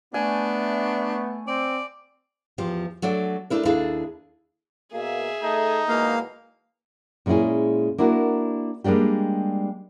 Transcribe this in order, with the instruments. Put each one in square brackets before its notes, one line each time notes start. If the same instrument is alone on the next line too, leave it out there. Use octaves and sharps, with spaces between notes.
[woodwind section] A3 [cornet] B3 [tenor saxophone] D4 [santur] G#5
[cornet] C4 [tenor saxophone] D5
[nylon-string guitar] E2 F3 G4
F#3 A3 D4 D5
A3 D4 E4 A#4
D#2 D4 E4 G#4 A4 F5
[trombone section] B2 A#3 [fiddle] G#4 E5
[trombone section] A3 [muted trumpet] D#4
[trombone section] E2 B2 G#3 [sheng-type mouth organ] A#3 F5
[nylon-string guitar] A#2 G#3 C#4 E4 G#4
A#3 D4 E4 F#4 A#4
G3 G#3 A#3 D4 G4